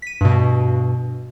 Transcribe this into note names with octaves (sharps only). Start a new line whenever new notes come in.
B6 D#7
G2 B2